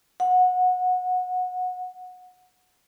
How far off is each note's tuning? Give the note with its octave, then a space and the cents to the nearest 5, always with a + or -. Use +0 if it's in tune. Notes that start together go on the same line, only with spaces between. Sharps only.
F#5 -20